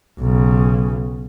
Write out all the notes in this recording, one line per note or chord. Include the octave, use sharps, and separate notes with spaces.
B1 C#3